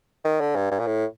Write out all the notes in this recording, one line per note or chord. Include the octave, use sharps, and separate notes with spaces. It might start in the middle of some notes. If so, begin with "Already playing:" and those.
D#3
D3
G2
G2
A#2
A2